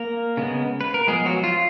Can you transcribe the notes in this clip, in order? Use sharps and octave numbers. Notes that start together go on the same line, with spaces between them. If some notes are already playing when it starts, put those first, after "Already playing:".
Already playing: A#3 A#4
C#3 G#3 B3
B4
A#4
F3 G#3 B3 G#4
F#3 F#4
F4